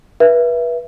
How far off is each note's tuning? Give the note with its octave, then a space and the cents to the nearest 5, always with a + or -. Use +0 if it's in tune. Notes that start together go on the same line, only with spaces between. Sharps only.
B4 -30 E5 +15